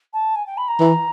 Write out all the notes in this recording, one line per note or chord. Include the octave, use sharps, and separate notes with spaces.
A5
G#5
G5
B5
A#5
E3